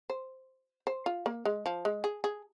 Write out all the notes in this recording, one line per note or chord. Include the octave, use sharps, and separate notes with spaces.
C5
C5
F4
A#3
G#3
F3
G#3
G#4
G#4